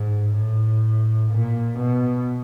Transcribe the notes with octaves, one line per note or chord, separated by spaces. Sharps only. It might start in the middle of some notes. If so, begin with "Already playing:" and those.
Already playing: G#2
A2
A#2
B2